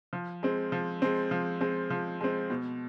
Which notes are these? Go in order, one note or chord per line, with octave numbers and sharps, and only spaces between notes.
F3
G#3 C4
F3
G#3 C4
F3
G#3 C4
F3
G#3 C4
B2